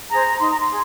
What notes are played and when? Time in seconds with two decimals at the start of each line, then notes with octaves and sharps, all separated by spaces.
0.08 G#4 C5 A#5
0.38 D#4 C6
0.49 A#5
0.60 C6
0.68 G#4